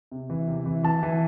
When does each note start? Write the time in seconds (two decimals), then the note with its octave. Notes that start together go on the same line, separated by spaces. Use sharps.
0.11 C3
0.30 E3
0.47 C3
0.66 E3
0.83 E3 A5
1.03 E3